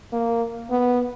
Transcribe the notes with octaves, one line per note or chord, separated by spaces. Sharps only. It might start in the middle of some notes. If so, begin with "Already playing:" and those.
A#3
B3